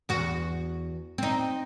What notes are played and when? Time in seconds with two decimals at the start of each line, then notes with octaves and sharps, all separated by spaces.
0.09 E2 F#4
1.18 C4 D#4